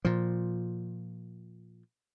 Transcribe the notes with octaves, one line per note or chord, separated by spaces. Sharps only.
A#2 F3